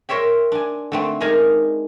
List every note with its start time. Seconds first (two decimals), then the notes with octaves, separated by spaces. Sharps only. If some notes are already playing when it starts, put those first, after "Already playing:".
0.09 A#4 C5 C#5 E5 G5
0.52 D4 G#5
0.92 D3 A3 C4
1.20 G#3 D4 D#4 A#4 G#5